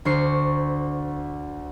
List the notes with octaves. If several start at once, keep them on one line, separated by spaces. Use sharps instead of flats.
D2 D4 C5 C#6 C7